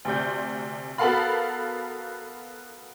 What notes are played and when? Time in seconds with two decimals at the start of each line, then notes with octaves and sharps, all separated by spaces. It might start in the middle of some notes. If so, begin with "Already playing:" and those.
0.05 D2 C3 D5 G6
0.98 B3 F#4 A4 A#4 F5 B5